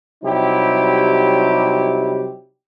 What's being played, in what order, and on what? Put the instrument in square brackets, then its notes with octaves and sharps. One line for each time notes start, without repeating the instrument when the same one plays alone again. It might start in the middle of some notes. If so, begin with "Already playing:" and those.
[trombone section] C3 F#3 G3 D#4 E4 G4